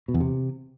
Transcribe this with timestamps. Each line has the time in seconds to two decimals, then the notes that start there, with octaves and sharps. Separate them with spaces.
0.08 B2
0.14 E2
0.20 C3